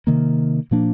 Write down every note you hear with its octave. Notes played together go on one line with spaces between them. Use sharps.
C3 D#3 A#3
A#2 F3 A#3 D4